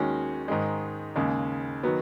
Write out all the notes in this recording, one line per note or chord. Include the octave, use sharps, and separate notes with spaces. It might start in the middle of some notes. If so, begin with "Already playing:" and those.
Already playing: D#2 D#3 G#3 C#4 F#4
G#2 D#3 G#3
D#2 C#3 G#3
D#3 F#3 B3